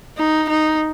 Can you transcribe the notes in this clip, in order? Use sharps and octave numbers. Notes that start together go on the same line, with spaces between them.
D#4
D#4